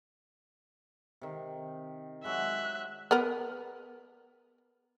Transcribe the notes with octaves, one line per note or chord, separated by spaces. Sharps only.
C3 D#3
F#3 G#3 E5 F#6
B3 A#4